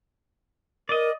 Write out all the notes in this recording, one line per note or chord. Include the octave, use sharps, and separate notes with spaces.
A#4 D5 D#5